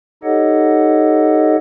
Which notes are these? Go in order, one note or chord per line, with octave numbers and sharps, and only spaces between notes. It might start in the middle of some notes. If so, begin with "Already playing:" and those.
D#4 G4 A4 C#5 D#5 F#5